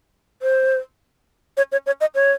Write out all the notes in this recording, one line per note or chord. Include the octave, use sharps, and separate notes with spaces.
C5
C#5
C#5
C#5
D#5
C#5